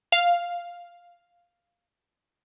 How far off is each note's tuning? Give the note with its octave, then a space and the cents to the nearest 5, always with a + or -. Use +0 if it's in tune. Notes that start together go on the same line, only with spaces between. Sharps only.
F5 +0